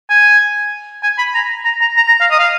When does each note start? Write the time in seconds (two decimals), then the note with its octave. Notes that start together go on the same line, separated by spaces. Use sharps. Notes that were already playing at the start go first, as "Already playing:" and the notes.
0.10 G#5
1.03 G#5
1.18 B5
1.35 A#5
1.65 A#5
1.81 A#5
1.96 A#5
2.08 A#5
2.20 F5
2.31 D#5
2.39 F5